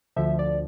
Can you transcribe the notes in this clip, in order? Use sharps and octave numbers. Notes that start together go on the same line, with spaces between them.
D2 D3 F3 E5
D5